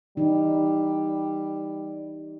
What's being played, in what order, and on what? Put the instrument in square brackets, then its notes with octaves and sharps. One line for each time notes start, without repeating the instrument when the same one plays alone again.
[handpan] E3 D#4 [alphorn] G3